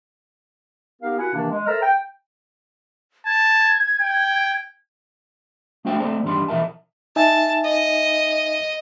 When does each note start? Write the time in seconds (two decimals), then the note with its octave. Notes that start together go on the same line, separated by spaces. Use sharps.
1.01 B3 D#4 G4 A#4 F5
1.18 E4 F#4 A#4 F#5 G#5
1.33 C3 D#3 E3 A#3 D4
1.50 G#3
1.66 A4 A#4 C5 E5 A#5 F6
1.82 G5
3.26 A5 G#6
4.01 G5
5.85 G#3 A3 D4 F#4 C5 G5
6.00 A3 C4 A4 C5 D5 A5
6.23 E2 G2 D#3 G3 D4 C6
6.48 B2 E3 C4 A#4 E5 A5
7.16 D#4 E5 G#5 A5
7.65 D#5